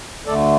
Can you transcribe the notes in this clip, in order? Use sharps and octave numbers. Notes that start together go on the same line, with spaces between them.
D2 D3 A3 A4 D5